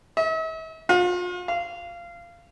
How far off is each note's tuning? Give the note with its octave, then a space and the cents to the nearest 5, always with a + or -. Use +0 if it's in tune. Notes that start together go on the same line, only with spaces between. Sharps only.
E5 -45
F4 +40
F5 -20